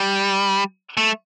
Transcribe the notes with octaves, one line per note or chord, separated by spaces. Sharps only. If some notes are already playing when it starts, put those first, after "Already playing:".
Already playing: G3
A3